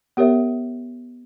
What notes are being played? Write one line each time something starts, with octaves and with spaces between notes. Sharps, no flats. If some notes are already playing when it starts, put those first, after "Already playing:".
B3 G4 A#4 C#5 E5